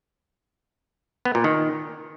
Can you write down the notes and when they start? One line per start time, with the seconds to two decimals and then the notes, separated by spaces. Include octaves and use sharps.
1.25 B3
1.35 A#2
1.44 D#3